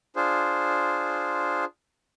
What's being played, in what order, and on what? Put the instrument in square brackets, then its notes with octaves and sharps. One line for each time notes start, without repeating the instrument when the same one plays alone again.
[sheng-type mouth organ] D4 F4 G#4 C5